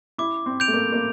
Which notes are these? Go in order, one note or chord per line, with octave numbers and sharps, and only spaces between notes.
E4 D6
C4
G6 D7 F7
A3
A#3
A#3